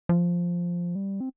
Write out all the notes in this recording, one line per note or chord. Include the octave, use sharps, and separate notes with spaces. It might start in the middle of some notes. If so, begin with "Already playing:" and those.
F3
G3
C4